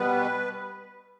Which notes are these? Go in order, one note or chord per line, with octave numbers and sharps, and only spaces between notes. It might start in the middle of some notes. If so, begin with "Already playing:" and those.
Already playing: B2 G3 B3 B4